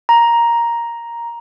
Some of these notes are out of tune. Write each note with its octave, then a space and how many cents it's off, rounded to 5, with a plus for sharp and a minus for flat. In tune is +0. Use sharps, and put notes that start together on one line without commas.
A#5 +5